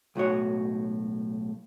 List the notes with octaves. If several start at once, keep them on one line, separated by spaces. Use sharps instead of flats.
B1 A2 F#4 C#5